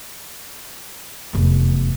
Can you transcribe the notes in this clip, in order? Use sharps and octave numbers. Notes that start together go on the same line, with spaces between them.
F1 E2